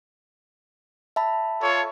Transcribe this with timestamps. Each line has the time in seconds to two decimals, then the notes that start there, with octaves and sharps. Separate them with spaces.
1.16 E5 A5 B5
1.61 F4 A4 C#5